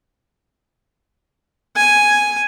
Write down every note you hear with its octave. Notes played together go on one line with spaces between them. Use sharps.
G#5